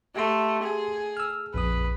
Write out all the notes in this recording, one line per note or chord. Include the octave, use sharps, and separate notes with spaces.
A3 G4 F#5 C6
G#4
E6 F6
A#1 F2 B4 D#6